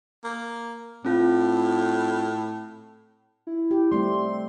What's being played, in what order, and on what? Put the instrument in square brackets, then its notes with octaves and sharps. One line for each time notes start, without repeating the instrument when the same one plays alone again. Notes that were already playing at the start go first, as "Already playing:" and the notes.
[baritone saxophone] A#3
[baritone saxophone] A2 [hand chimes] C4 F4
[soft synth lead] E4
[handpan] G4
[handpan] G3 A3 C4 [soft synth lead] C6